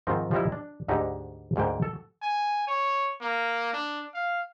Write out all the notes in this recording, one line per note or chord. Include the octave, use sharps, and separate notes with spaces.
G#2 D#3 F3 C4 D#4
F3 G3 D#4 E4
D4
D2 G#2 D3 D#4 G4
D2 G#2 A#3 G5
A4
G#5
C#5
A#3
D4
F5